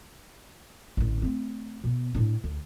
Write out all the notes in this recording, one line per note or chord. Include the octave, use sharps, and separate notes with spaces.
A1 D3
A3 C4
B2 B3
A2 D4
D2